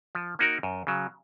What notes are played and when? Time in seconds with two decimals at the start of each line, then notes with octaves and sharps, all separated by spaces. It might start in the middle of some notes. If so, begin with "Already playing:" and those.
0.15 F3
0.39 A#3 D#4 F#4 A#4
0.63 F#2
0.87 C#3 F#3